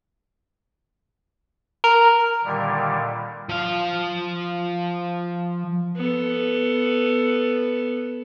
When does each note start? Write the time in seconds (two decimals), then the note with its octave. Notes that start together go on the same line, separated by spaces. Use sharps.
1.84 A#4
2.44 A#2 D3 D#3 G3
3.49 F3 F5
5.96 B3 A4